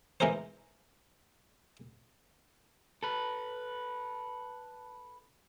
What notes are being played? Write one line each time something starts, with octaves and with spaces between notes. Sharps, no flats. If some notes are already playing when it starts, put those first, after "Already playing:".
E3 G#3 D#4 G#4 A#4 C5
A4 B4